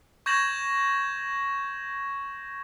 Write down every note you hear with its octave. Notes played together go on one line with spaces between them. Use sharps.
C#6 G6 G#6 A#6 E7 F#7